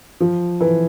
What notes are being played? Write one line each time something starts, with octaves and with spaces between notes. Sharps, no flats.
F3
E3